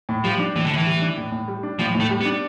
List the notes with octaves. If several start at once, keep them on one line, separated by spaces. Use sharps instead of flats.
A2
F3 G3
D4
A2 E3
D3
A2 E3
G3
D4
A2
A2
G3
D4
A2 F3
A2
A3
G3
B3
D4